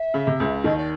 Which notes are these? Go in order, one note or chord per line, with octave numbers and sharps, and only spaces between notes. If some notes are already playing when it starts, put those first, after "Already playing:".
Already playing: E5
C#3
C3
C#2 C#3
D#2 D#3 D#5
D5